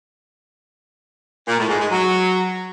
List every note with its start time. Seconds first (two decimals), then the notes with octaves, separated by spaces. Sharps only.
1.48 A#2
1.58 A2
1.69 G#2
1.80 G#3
1.90 F#3